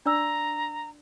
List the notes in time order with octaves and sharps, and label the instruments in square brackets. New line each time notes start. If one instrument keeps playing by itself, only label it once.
[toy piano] D4 D5 E6 [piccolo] A#5